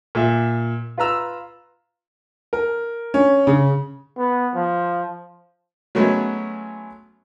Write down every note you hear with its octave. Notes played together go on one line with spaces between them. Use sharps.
A#2 E5
F4 B4 A#5 E6
A#4
C#4
C#3
B3
F3
F#3 G#3 A3 B3 C#4 F#4